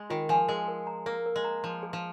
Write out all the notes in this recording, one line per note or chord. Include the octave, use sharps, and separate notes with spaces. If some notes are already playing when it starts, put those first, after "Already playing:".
Already playing: G#3 C6
D#3 F4
F3 G#5
G#3 A#4
A#4
A#5
A#3 A#4
A#4
G#3
A#5
F3 C6
G#4
F3